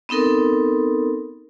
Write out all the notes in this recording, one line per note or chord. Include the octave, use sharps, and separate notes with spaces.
B3 C4 D#4 A4 A#4